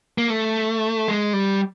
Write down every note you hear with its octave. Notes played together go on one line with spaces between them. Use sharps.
A#3
A3
G#3
G3